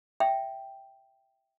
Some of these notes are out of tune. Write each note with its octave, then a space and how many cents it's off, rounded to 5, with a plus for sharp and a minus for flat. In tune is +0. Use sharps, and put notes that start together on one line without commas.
E5 +0 G5 +0